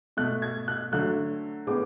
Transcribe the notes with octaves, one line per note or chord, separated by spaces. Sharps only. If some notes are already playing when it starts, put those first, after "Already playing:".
B2 A3 F#6
G#6
F#6
D3 F#3 A3 F#6
A2 G#3 B3 D6